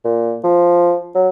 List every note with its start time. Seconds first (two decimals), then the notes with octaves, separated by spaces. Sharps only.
0.05 A#2
0.44 F3
1.15 F#3